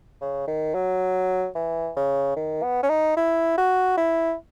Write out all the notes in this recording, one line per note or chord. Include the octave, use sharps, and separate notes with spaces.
C#3
D#3
F#3
E3
C#3
D#3
B3
C#4
D#4
E4
F#4
E4